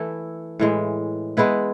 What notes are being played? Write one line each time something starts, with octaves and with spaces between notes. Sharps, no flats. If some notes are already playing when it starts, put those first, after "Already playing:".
Already playing: E3 A3 E4
A2 E3 G#3
G#3 B3 E4 B4